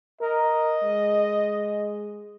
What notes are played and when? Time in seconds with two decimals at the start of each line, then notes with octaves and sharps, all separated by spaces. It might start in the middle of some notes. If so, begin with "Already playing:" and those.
0.21 A#4 D#5
0.83 G#3